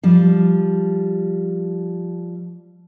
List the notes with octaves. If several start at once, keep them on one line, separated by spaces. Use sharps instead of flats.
F3 G3